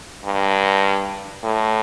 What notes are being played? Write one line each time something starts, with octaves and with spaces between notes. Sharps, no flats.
G2
A2